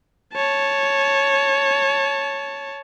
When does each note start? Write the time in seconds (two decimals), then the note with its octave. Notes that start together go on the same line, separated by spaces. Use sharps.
0.34 C#5 A5